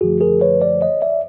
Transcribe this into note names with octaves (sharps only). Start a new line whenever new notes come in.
F#2 D3 F3 A3 F#4 G#4
G#4 A#4
B4 C#5
C5 D5
C#5 D#5
D5 E5